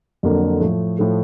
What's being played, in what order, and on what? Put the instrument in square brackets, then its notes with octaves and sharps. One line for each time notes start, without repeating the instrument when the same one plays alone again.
[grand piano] F2 D3 F#3 A#3
A2 F3 A3
A2 F3 A3